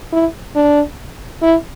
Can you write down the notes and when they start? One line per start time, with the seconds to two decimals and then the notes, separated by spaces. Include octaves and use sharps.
0.13 E4
0.55 D4
1.42 E4